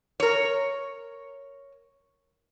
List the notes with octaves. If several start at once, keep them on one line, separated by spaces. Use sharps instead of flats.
A#4 C#5